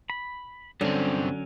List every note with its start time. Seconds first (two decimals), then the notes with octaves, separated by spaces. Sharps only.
0.10 B5
0.81 G2 D3 F#3 C4 C#4